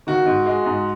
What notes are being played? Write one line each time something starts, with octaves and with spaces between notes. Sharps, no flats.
D#3 F#4
G#2
G#3
G#2